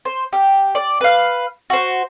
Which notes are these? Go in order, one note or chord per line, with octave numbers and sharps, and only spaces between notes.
C5
G4
D5
B4 F5
F#4 C5